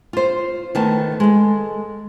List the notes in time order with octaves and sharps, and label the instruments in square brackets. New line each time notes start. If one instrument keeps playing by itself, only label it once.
[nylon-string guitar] F4 C5
D#3 A3 B3 A5
G#3 A4